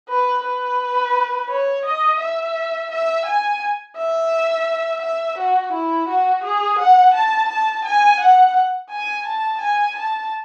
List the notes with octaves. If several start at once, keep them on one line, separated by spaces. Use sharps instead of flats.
B4
B4
C#5
D#5
E5
E5
G#5
E5
E5
F#4
E4
F#4
G#4
F#5
A5
A5
G#5
F#5
G#5
A5
G#5
A5